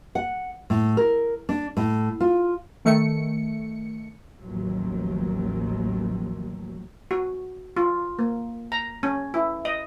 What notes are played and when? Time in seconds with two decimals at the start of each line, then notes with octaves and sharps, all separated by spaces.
0.15 F#5
0.70 A2
0.97 A#4
1.49 D4
1.77 A2
2.20 F4
2.85 D#3 A3 C#7
4.41 A1 D#2 D#3 F3 F#3
7.11 F#4
7.77 F4
8.19 A#3
8.72 A#5
9.03 C#4
9.34 E4
9.65 D#5